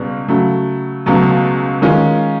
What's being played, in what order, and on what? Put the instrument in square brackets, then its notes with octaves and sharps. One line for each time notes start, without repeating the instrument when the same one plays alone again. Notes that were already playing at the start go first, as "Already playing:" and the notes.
Already playing: [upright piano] C#2 B2 G3
C#3 F#3 A3
C#2 B2 F#3 A3
D#3 G#3 C#4 F4